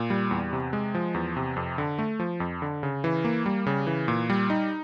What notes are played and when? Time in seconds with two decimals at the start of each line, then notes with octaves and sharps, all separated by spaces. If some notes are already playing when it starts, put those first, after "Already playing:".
Already playing: A#2
0.10 G3
0.31 E2
0.53 C3
0.73 G#3
0.95 F3
1.14 E2
1.37 C3
1.56 F2
1.78 D3
1.99 A3
2.20 F3
2.40 F2
2.62 D3
2.83 C#3
3.04 E3
3.25 A#3
3.46 G3
3.66 C#3
3.87 E3
4.08 A#2
4.30 G3
4.50 D#4